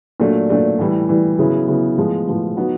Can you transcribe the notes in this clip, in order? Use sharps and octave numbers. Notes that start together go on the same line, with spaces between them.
A#2 F#3 A3 D4
A#2 F#3 A3 D4
A2 E3 G3
A2 E3 G3
C#3 F#3 B3 E4
C#3 F#3 B3 E4
A2 F3 G#3 B3
A2 F3 G#3 B3
F#3 B3 D#4 F#4